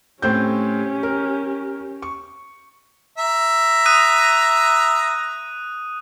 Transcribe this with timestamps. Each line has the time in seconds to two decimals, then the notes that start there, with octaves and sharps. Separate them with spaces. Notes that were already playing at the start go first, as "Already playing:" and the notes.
0.22 A2 C4 C#4 G4 G6
1.03 A#4
2.02 C#6
3.18 E5 A#5
3.86 D#6 F#6 D#7